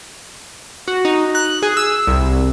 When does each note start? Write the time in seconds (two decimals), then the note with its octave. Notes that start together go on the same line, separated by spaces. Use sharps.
0.88 F#4
1.05 D#4
1.35 F#6
1.63 G#4
1.77 E6
2.07 C2